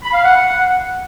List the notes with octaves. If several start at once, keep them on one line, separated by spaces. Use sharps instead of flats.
B5
F5
F#5